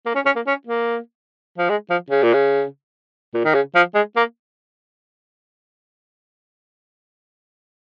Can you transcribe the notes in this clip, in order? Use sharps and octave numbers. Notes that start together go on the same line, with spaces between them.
A#3
C#4
C#4
A#3
C#4
A#3
F3
G#3
F3
C#3
A#2
C#3
A#2
D#3
C#3
F3
G#3
A#3